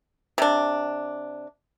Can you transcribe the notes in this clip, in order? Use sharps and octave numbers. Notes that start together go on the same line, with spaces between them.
C3 D4